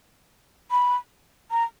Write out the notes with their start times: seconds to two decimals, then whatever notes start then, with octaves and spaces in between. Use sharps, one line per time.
0.71 B5
1.51 A#5